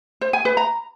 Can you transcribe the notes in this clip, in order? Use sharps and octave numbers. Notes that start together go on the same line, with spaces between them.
C5
G#5
B4
A#5